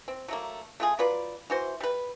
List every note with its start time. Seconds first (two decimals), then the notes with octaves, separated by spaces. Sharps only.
0.08 C4
0.28 F#3 A3 A#3
0.80 A3 F4 G#4
0.99 F#3 F4 B4 D5
1.50 E3 F#4 C5
1.80 G3 B4